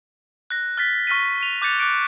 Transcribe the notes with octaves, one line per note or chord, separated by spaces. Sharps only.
F#6 A#6
F6 A6 B6
C#6 F6 A#6 B6 D#7
D#7 F7
D6 F#6 G6 A6 C#7 F7
D6 F#6 C#7 D7